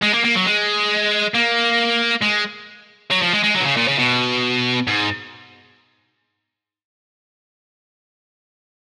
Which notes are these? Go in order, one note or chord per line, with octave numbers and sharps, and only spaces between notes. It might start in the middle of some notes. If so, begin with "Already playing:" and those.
G#3
A#3
A#3
F#3
G#3
A#3
G#3
F#3
F3
G#3
G#3
F#3
B2
C#3
A#2
C#3
B2
G#2